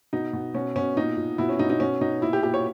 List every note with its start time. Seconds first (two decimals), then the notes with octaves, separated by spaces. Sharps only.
0.13 B2 D#4
0.33 B2
0.54 B2 C#4
0.76 B2 C#4
0.97 A#2 D#4
1.17 A#2
1.38 B2 E4
1.49 C#4
1.59 B2 D#4
1.69 D#4
1.80 B2 C#4
2.01 B2 D#4
2.22 A#2 E4
2.33 G4
2.43 A#2 G4
2.54 C#5